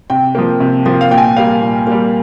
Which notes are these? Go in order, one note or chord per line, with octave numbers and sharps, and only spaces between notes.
C3 G5
F3 A#3
C3
F3 A#3
F5
A#2 G5
G#5
G5
G3 A#3 F5
A#2
G3 A#3